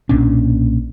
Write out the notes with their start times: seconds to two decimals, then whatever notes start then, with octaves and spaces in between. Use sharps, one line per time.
0.09 B1 A#2 C#4 D4